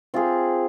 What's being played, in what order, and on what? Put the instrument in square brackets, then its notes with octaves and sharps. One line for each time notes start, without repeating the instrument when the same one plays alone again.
[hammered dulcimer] C4 F4 G#4